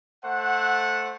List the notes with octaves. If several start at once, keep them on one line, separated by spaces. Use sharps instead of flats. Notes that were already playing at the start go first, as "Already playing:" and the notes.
A3 C5 F#5